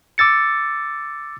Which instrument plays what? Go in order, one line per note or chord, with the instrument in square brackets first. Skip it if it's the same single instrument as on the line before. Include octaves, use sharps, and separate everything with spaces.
[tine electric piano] D6 E6 A6 C#7